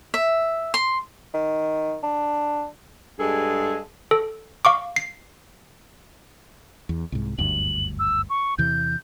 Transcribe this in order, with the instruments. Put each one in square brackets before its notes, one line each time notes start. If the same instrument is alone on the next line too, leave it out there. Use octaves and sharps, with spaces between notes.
[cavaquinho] E5
C6
[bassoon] D#3
D4
[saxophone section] G2 G#3 G#4 A4
[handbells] A4
F5 C#6 D6
C7
[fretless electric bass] E2
C2 G#2
[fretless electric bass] F#1 D2 G2 [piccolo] F#7
[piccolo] E6
C#6
[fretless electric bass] E2 C3 E3 [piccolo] G6